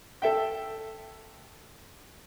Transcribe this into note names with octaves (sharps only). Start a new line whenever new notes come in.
A4 E5 G5